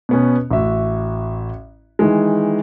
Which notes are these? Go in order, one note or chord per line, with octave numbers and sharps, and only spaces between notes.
B2 B3 C#4
A1 F#4 E5
D#3 E3 G#3